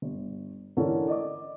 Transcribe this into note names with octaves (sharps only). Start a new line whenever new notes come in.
G1
D3 E3 C#4 A4 A#4 C#5
D5 D#5 D6